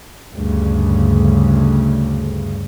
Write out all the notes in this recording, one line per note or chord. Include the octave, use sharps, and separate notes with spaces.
D2 G2 C#3